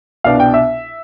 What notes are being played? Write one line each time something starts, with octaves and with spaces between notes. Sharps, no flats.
C2 B2 B3 D4 F5
G5
E5